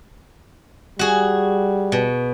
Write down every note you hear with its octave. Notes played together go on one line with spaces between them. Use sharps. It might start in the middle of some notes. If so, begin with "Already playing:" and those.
G3 F#4 G#4
B2